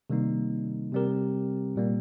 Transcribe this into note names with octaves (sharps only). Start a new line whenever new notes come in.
C3 D#3 G3 A#3 D#4
C3 G3 C4 G4 A#4
A#2 G3 A#3